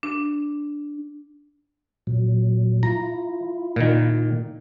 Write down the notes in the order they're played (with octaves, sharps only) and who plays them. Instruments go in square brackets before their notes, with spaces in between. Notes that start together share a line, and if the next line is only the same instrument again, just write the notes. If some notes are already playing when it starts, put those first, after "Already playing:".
[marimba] D4
[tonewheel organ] A#2 F#3
[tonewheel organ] E4 F4 [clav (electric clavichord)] A#5
[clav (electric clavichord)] A#2 D#3